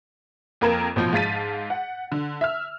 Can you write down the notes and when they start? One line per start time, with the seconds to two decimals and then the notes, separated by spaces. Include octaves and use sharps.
0.61 F2 A#3 A#4 G#6 E7
0.96 A1 B2 F3 G6
1.13 G#2 F5 A5 A6 B6 D#7
1.70 F#5
2.12 D3
2.41 E5 E6 F6